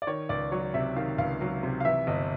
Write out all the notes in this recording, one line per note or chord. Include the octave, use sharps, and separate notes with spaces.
D5
D#3 C#5
C#2 D5
F#3 C#5
C3 E5
D#3 F5
C#2 F5
F#3
C3
F5
E3 E5
G1 D#5